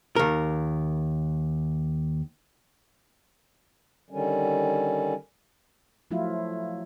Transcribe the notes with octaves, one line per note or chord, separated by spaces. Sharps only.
D#2 A#4
D3 D#3 G3 C#4
F3 F#3 A3 E4 F4